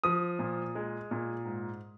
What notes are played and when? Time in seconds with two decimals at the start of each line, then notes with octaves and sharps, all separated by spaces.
0.04 F3 D#6
0.39 A#2
0.75 G#3
1.11 A#2
1.45 G#2